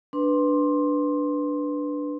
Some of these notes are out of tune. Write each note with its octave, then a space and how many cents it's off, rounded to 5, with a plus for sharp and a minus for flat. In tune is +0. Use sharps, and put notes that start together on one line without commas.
D4 +0 B4 +0 C6 +15